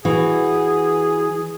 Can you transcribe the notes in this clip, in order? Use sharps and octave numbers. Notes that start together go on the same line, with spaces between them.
E3 F#4 G#4